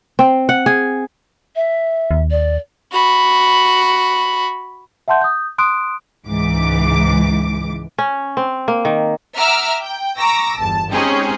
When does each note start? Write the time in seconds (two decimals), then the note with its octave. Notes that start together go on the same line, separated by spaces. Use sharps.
0.19 C4
0.49 F#5
0.66 G#4
1.56 E5
2.11 D#2
2.31 D5
2.93 F#4 B5
5.08 E5 F#5 A5 C6 G6
5.21 D#6 G6
5.58 C6 D#6 F#6 D7
6.26 C#2 G#2 E3 D6
7.98 C#4
8.37 C4
8.68 A#3
8.85 D#3
9.37 E5 F#5 A#5 D6 E6 F6
9.81 G5
10.18 A#5 C#6 D6 E6 A#6
10.58 G1 E2 A5
10.91 G#3 C4 C#4 D#4 G4 G#4